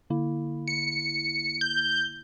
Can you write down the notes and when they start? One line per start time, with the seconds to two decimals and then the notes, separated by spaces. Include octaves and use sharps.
0.10 D3 A#3 E4
0.68 C#7
1.61 G6